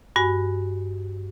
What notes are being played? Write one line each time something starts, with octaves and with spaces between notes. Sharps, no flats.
G2 F#4 G#5